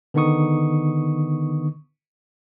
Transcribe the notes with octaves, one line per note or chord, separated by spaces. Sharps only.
D3 D#3 B3 D#4 C#6 D#6